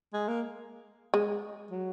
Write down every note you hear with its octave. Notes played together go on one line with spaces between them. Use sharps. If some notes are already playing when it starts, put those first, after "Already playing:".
G#3
A#3
G#3
F#3